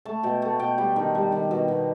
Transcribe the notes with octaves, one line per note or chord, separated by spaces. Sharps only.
A3 A5
B2 G5
A3 G5
B2 G5
G3 G5
D#3
G3
D#3
B2
B2